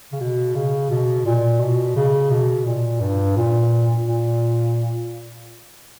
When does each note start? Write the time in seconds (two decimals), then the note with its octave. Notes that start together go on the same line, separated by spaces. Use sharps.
0.13 C#3
0.20 B2
0.55 C#3
0.90 B2
1.26 A#2
1.60 B2
1.96 C#3
2.31 B2
2.66 A#2
3.01 G2
3.36 A#2
4.07 A#2